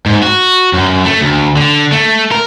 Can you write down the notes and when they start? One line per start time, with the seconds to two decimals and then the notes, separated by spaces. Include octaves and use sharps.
0.06 G#2
0.23 F#4
0.73 F#2
1.05 A3
1.21 D2
1.56 D3
1.92 A3
2.32 A#4